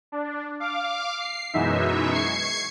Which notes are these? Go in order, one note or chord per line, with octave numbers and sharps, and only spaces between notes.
D4
F5 D6
C7
F#2 B2 E3 G#3 D#4 E5
C#6 G#6 C7 C#7